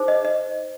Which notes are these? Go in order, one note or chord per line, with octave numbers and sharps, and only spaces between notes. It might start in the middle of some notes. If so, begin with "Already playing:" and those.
Already playing: D#4 G#4 C5
D#5
D#5